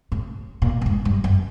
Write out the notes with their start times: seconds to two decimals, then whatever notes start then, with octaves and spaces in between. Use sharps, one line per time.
0.12 A2
0.62 A#2
0.81 A2
0.86 G#2
1.05 G2
1.24 F#2